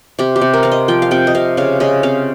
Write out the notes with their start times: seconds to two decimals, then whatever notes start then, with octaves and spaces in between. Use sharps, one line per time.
0.19 C3 G4
0.36 G4
0.41 C3
0.53 A#4
0.63 C4 F5
0.71 D#5
0.88 F3 G5
1.02 F5
1.11 C3 G5
1.27 D#5
1.35 C3 F5
1.57 C#3 F5
1.80 C#3 D#5
2.03 C4 F5